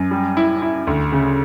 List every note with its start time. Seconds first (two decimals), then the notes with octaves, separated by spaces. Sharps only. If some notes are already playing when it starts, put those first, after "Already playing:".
Already playing: F#2
0.11 G3
0.37 E4
0.62 E4
0.87 D2
1.12 C#3